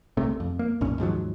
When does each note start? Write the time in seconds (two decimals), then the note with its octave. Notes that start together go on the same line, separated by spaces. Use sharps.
0.17 C2 C3 A3
0.40 F2
0.59 A#3
0.81 B1 F#2 A#2 C#4
0.98 D#2 G#2 F3 F#3